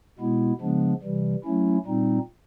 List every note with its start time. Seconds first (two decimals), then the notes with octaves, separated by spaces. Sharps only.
0.19 B2 G#3 B3 E4
0.61 C#3 F3 G#3 B3 D4
1.03 C3 E3 G3
1.44 F#3 A3 C#4 E4
1.86 A#2 G3 C4 D#4